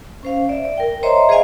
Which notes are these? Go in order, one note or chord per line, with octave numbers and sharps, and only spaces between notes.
C#4 C5 F5
D5 E5
D5
A#4 G5
C5 C#5 D#5 E5 A#5 C6
G#4 C5 D5 D#5 F5 G#5